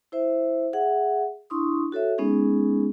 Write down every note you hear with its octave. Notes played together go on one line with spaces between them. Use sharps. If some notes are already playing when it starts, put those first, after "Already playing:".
E4 C5 E5
G#4 E5 F#5
D4 E4 C6 C#6 D#6
F#4 A4 C#5 E5
G#3 B3 C#4 D#4 G#4